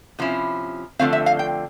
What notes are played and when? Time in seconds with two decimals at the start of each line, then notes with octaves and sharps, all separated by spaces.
0.19 C3 F3 C#4 E4
0.99 D3 F3 A3 C4 F5
1.13 E5
1.26 F5
1.39 G5